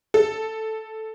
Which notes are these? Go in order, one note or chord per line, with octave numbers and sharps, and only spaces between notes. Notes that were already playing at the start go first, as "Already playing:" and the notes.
A4